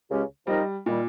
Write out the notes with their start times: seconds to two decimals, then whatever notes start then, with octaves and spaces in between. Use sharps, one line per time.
0.09 C#2 C#3 G#3 C#4 G4
0.47 F3 G3 C4 D#4 A#4 D#5
0.86 A#2 D#3 G3